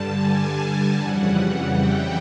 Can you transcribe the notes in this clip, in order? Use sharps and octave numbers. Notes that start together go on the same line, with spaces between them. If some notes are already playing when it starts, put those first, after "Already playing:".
Already playing: G2 D3 G3 A5
G#5
F2 C#3 E3 G3 F#5
G5